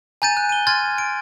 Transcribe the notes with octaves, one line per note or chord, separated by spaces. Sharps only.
G#5 A#5 G6 A6 D#7
F#6
D#7 G7
G#5 C6 F6 G#6 A6
D7